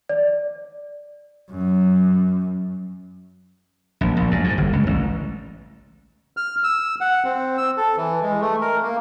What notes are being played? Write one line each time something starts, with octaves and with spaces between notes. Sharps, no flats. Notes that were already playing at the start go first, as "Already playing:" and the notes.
D5
F#2
A#1
A#1
F#2
G#2
G1
C#2
A1
F6
E6
F#5
C4
E6
A4
E3
G#3
A3
A#4
A#3